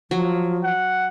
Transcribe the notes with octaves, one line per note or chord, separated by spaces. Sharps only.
F3 F#3
F#5